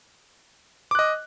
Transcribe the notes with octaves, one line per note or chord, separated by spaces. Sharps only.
D#5 D6 F#6